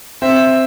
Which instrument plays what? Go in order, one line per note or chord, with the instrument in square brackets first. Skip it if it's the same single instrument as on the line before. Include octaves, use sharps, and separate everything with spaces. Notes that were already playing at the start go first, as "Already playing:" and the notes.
[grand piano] C4 [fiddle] E5